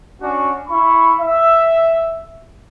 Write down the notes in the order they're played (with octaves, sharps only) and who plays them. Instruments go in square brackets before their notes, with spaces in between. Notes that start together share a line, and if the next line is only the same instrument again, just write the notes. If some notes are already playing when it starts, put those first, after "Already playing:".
[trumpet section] C#4 D4 F#4
E4 B5 C#6
E5